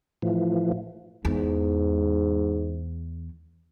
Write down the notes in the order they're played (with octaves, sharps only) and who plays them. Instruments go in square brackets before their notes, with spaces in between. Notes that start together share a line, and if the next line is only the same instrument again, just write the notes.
[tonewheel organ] A2 E3 F3
[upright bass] E2 [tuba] G#2